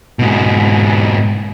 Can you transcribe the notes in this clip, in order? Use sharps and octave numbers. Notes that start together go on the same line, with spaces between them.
G#2 B2